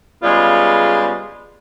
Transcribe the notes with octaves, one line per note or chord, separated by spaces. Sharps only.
C#3 G3 G#3 B3 F4